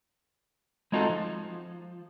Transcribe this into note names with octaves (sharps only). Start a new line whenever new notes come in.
G#3 C4 D#4 F4 F#4 A4
F3